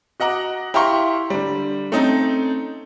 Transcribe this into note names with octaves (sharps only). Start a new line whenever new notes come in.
F#4 D#5 F#5 A#5 D6
E4 G4 F5 A#5 C6 C#6
D3 G3
A3 C4 C#4 D#4